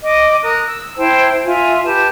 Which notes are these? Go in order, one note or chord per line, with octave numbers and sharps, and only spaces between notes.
D#5 D6
A#4 D#6 F#6
E6
E4 C5 G5 A5
F4 E5 G#5
G4 B4 A5